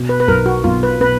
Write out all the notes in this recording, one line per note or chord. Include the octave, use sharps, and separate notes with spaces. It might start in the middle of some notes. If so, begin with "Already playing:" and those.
Already playing: B2
B4
B4
B1 A#4
F#4
B1 F4
B4
B2 B4